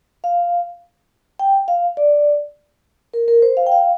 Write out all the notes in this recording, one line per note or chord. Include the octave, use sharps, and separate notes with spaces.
F5
G5
F5
D5
A#4
A#4
C5
F5
G5
F5